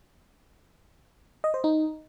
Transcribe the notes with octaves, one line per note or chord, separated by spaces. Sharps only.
D#5
C5
D#4